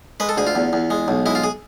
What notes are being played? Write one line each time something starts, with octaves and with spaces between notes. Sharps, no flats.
G#3 B4
A4
D2 G#4
F4
E2
E2
G#3
B1
G#3 E4
F4
G#4